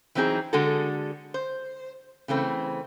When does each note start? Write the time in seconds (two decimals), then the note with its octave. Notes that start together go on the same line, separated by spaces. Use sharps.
0.15 E3 F#3 C4 D#4 G#4
0.53 D3 G#3 F#4 G#4 A4
1.34 C5
2.28 C#3 E3 A3 C4